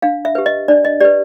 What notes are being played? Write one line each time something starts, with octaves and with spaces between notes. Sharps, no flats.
D4 F5
E5
G4 B4
D#5
D4 D5
D#5
G4 B4 D5